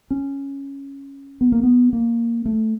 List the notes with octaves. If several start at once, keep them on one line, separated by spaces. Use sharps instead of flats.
C#4
B3
A#3
B3
A#3
A3